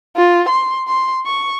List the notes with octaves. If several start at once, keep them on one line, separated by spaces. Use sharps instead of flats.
F4
C6
C6
C#6